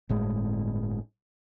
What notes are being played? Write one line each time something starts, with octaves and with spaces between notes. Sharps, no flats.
G1 A2 G#3